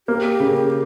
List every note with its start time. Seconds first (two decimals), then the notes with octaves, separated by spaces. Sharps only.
0.08 A#3 G4
0.40 C#3